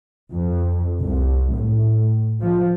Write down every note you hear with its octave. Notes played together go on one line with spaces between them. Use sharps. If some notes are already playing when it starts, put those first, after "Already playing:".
F2
C2
A2
F3